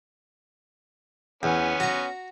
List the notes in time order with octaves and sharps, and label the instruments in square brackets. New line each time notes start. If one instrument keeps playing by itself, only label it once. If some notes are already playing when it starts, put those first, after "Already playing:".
[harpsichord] E2 [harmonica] B3 C#4
[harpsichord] F#4 A#5